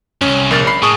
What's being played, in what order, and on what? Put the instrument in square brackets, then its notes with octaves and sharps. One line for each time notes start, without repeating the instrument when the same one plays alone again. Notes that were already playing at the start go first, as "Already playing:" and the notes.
[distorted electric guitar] C2 F#2 [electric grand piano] C#4
[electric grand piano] A#1 A#4 A6
B5 C7
[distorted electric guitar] A2 [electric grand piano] G#4 C#6 D#6